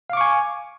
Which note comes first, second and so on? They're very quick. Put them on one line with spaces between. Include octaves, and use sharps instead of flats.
F5 D6 C#6 G#5